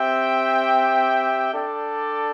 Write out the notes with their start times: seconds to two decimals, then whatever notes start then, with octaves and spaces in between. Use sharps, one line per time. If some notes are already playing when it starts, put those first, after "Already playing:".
Already playing: C4 G4 E5 G5
1.53 D4 A4 D5 G5